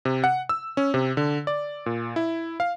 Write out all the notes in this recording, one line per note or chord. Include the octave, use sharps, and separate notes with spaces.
C3
F#5
E6
C#4
C3
D3
D5
A#2
E4
F5